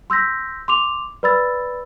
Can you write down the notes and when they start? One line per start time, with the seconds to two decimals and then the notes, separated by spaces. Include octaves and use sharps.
0.10 C6 E6 G6 A#6 B6
0.68 C6 D6 F7
1.23 B4 D5 B5 E6 A6